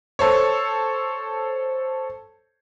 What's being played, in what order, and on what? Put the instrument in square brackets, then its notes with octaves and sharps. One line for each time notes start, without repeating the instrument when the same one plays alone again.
[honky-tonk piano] A4 C5 C#5